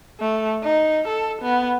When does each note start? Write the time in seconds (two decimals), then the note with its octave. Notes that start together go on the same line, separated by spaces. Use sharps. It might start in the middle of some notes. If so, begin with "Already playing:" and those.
0.20 A3
0.64 D#4
1.08 A4
1.42 B3